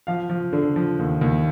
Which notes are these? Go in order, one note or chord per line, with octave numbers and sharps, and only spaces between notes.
F3 F5
F3
D3
F3
D#2
D#2